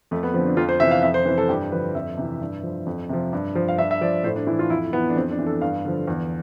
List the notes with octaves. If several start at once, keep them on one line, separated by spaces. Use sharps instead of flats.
F2 A3
B3
D3 F3 C4
D4
F2 F4
C5
C3 E3 E5
F5
F2 E5
C5
C3 E3 B4
A4
G2 G4
D3 F3 B4
F2 E5
C3 E3
G2
F3
F2
C3 F3
G2
F3
F5
G2 E5
E5
F3 D5
A2 C5
D4
E3 E4
F4
F2 E4
E3 B3
D4
F2 C4
D4
E3
A4
G2 F5
D3 F3
E2